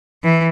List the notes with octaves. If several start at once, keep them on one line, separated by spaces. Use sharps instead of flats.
E3